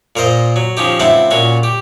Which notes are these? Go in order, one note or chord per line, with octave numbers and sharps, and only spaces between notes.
A#2 A#4 C5 D#5
F#3
F3 C#4 D#4 G4
C#2 C4 E4 F#5 A5
A#2 C#4 F#4
G4